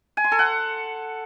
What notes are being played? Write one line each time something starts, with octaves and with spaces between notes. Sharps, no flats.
G#5
C6
A4
F#5